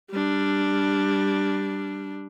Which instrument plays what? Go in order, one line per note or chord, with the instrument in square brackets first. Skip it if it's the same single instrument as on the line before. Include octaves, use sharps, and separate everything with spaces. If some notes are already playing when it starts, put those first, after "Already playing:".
[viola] G3 D4